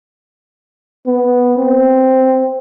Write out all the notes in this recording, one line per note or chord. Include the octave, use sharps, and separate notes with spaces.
B3
C4